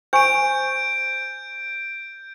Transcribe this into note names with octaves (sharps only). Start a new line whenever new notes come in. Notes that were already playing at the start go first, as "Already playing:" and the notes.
C5 G#5 C#6 G6 D7